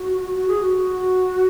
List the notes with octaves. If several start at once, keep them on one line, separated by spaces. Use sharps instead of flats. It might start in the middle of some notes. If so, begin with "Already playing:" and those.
Already playing: F#4
F#4
G#4
F#4